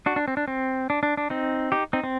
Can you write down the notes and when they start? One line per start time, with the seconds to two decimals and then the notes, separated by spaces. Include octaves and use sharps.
0.06 D4 F#4
0.16 D4
0.28 C4
0.37 D4
0.48 C4
0.90 D4
1.03 D4
1.17 D4
1.30 C4 D#4
1.72 D#4 G4
1.93 C4 D#4
2.03 C4